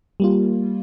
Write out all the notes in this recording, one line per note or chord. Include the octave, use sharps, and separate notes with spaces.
G3 A#3 F4